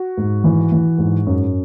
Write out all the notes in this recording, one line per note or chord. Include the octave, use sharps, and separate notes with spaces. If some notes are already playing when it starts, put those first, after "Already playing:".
Already playing: F#4
G#2
E3
E3
G#2
F#2